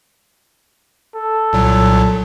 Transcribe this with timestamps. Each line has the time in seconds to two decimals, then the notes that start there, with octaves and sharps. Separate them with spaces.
1.15 A4
1.53 C2 A#2 F#3